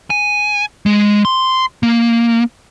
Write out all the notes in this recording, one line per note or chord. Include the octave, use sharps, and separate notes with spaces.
G#5
G#3
C6
A#3